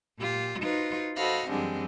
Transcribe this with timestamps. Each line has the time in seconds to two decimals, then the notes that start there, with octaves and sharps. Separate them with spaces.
0.19 A#2 F4 G4
0.61 D#4 F4 F#4 B4 C5
1.16 F#4 A4 C5 D#5 F5 B5
1.48 F#2 D3 E3 G3 G#3 C4